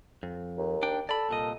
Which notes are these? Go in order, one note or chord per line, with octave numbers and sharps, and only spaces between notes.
F2
D#2
D4 G5
A4 D5 B5
C2 A#2 D#5